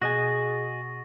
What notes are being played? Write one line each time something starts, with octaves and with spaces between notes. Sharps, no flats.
B2 F#4 G#4 D#5 G#5 C#6 A6 A#6